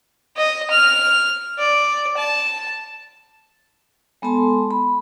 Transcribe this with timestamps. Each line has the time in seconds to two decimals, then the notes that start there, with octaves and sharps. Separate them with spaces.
0.36 D#5
0.70 F6
1.58 D5
2.17 A5
4.22 G#3 B3 A4 A5 C6
4.71 B5